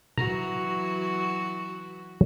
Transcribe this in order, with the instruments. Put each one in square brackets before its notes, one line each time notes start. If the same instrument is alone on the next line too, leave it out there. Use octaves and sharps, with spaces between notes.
[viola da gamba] E3 F#3 F#4 [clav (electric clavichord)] A#5